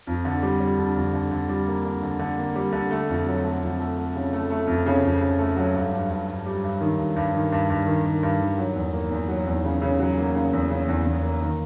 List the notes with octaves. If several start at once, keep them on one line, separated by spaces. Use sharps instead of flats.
F2
D3
G3
G3
D3
F2
D3
D3
G3
A#3
D3
D3
D3
A#3
G3
D3
A3
F2
F#3
A3
F2
A3
A3
C#3
A3
A3
F2
C#3
F2
C#3
A3
F#3
G2
G2
G2
G2
G3
G2
D#3
G2
G2
D#3
G2
G2
D#3
D#3
G2
D#3
F#3
E2
A#3
E2
F#3
E2
C#3
C#3
F#3
A#3
C#3
E2
C#3
E2
E2
A#3
D#3